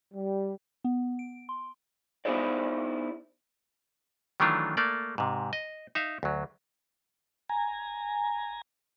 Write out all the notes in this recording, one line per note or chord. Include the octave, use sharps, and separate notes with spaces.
G3
B3
D7
C6
B3 D#4 E4 G#4 C5 D5
D#3 E3 F#3 A3 D4 F4
A3 A#3 D5
G#2 C3
D#5
D#4 E5 F5
D2 F#3
G#5 A#5